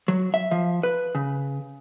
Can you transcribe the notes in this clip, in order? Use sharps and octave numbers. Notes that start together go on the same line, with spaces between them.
F#3
E5
F3
B4
C#3